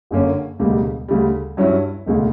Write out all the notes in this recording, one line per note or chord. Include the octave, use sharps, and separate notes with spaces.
F#1 F#2 D3 A#3 C#4
E1 D2 C#3 G3 A#3
D2 C#3 G3
G2 F#3 C#4 E4
E1 D2 C#3